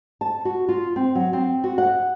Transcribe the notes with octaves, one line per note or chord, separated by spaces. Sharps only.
A5
F#4
F4
C4
F#3
C4
F#4
F#5